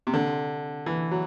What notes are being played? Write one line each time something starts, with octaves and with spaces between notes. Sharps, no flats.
C3
D3
E3
F#3